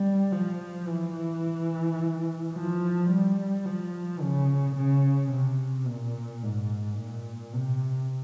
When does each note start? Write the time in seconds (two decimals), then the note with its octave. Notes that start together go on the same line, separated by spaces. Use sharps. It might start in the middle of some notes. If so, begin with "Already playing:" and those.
Already playing: G3
0.32 F3
0.88 E3
2.54 F3
3.10 G3
3.66 F3
4.21 C#3
4.76 C#3
5.32 C3
5.87 A#2
6.43 G#2
6.99 A#2
7.54 C3